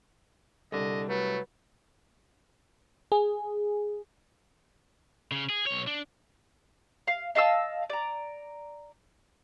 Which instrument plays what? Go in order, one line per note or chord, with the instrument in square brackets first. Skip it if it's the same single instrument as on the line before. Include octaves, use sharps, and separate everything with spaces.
[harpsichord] C2 [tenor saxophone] D3 [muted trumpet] D#5
[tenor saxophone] F#3 [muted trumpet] A3 [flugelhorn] B4
[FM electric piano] G#4
[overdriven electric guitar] C#3
G#4
B1 C#5
D4
[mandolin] F5
D#5 F5 A5 E6
D5 A#5